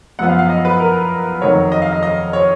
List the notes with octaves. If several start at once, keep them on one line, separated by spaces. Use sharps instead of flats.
F#2 F3 B3 F#5
F5
F5
D#5
B4
A#4
F2 D#3 F#3 C#5
D#5
F5
D#5
D#5
C#5